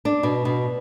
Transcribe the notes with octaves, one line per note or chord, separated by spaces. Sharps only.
D4
B2
B2